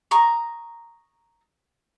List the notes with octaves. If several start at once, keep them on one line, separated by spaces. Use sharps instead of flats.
A#5 C#6 D#6